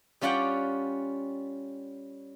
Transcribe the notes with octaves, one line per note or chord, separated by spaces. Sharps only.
G3 C#4 F4 D5 F#5 G5